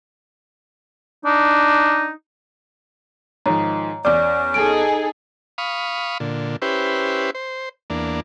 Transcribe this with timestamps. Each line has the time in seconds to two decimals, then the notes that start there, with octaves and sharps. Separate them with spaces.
1.25 D4 D#4
3.46 G#2 D#3 F3 C#5 A#5
4.05 E2 C#4 D5 D6
4.54 D#4 G#4 A4 G#5 D7
5.58 F5 B5 C#6 D#6
6.20 A#2 D3
6.62 C#4 E4 G4 B4 C5
7.35 C5
7.90 E2 A#3 D4